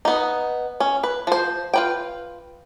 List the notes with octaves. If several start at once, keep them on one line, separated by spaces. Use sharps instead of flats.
B3 D#4
C#4
B4
F3 C5
F4 B4 G5